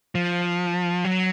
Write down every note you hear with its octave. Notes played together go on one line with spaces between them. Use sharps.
F3
F#3